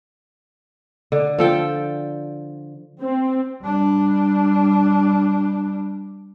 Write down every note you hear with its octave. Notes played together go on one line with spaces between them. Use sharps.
D3
F3 A4 G5
C4
G3 D4